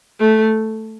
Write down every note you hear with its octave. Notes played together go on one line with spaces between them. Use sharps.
A3